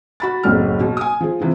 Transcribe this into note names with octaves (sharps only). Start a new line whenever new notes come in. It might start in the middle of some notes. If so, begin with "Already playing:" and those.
F#4 B5 A6
F#1 C2 A2 F#3 F6
B2
G#5 D#6
F3 G#4
C3 E3 F3